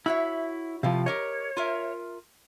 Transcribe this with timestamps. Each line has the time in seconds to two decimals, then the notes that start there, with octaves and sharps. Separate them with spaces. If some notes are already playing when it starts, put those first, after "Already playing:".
0.06 E4 F#4 C#5 E5
0.83 A2 C3 F3 F5
1.06 G4 A#4 C#5 D#5
1.57 F4 A#4 E5